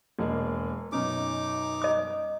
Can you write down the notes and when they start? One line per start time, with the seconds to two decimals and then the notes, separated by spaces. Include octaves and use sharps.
0.19 E1 G#3 A#3
0.92 F#2 B2 C#4 D#4 D6
1.82 D#5 D#6